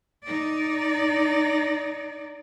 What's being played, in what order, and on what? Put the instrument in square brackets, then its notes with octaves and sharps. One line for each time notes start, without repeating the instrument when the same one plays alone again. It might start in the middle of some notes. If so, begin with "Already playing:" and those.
[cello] D#4 D5